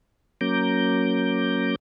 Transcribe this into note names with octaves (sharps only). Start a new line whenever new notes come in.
F#3 A#3 C#4 A#5 D6 G6